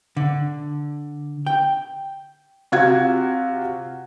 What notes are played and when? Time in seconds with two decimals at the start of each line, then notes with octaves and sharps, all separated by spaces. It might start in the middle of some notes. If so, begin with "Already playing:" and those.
0.17 D3
1.46 G5
2.72 C3 F4 F#4 F5 F#5 G#6